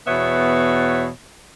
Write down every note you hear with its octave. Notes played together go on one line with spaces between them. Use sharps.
E2 B2 B3 C#5 E5